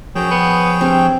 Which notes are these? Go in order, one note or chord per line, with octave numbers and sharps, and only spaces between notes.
F#2 F3 G#4 C#5 G5
B3
G2 C4